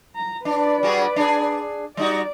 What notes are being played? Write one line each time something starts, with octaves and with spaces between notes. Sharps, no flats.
A#5
D4 B4 D5
G3 F#4 G#4
D4 G#4
G3 D#4 F#4 D5